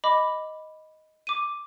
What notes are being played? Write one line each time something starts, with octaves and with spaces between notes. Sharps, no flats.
D#5 B5 D6
D6 D#7